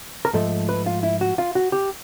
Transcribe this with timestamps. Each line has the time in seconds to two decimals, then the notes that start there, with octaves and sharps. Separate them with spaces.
0.25 A#4
0.33 G#2 F3 A3 A4
0.69 B4
0.86 F4
1.03 E4
1.21 F#4
1.38 F4
1.55 F#4
1.72 G4